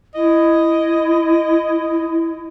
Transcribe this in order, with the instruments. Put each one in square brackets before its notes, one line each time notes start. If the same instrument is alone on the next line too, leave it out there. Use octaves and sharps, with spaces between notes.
[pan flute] E4 [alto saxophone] D#5